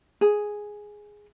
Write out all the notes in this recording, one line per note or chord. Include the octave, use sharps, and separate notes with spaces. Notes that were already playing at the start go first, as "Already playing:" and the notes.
G#4